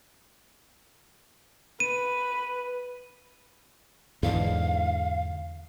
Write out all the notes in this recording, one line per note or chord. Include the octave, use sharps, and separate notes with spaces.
B4 D#7
E2 G#2 D3 F5